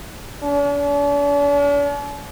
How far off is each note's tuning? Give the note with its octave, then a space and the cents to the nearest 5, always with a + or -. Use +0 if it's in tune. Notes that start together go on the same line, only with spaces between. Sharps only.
D4 -45